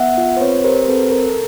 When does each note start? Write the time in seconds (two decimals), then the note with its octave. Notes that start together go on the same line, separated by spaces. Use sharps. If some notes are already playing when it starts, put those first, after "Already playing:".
Already playing: B3 E5 F#5
0.18 F4
0.37 C5
0.41 C4 B4 C#5
0.64 G4 A#4 C5
0.83 C5
0.88 C4 A4 B4
0.99 A#4
1.12 A4 A#4
1.24 A4